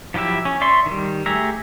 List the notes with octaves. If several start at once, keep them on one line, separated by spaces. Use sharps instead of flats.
F3 F#3 E4 G4 E5
C#4
D5 E5 C6 C#6
D#3 G3
A3 G4 G#4 E5 A#5